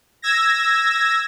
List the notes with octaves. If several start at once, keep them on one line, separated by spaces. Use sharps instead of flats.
E6 G#6 A#6